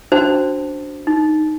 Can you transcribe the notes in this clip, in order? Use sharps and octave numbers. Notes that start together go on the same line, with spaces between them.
C#4 D4 F#4 C5 A5
D#4